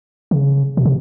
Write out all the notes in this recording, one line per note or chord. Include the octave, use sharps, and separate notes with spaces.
C#3
B2
C3